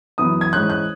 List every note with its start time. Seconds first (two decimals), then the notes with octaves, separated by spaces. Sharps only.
0.18 F#2 E3 B3 D#6
0.41 G#6
0.52 G#2 E3 G#3 C#4 F#6
0.70 F#6